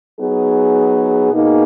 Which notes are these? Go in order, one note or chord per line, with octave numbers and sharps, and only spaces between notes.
F#3 B3 D#4 G#4
B2 A#3 D#4 G#4